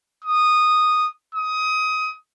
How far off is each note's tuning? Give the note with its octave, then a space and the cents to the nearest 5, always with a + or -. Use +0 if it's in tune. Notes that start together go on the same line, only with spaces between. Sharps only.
D#6 -10
D#6 +20